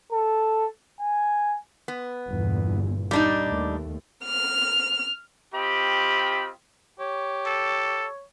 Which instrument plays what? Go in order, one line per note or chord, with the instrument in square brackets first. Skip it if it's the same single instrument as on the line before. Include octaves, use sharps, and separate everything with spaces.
[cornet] A4
G#5
[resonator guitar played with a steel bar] B3
[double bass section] G1 E2 A#2
[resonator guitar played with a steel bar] G3 D4 D#4
[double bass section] D#2 A3
[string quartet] F6
[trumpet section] C4 F4 G4 D#5 B5
[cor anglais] G4 [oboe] C#5
[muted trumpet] A4